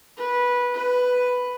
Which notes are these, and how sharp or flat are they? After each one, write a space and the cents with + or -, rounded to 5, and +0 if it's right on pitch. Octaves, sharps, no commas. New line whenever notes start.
B4 -15
B4 +5